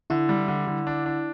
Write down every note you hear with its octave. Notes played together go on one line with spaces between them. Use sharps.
D3 E4
G3
D3
D3
D4
D4